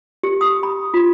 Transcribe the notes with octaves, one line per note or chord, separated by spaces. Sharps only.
G4
D#6
B5
F4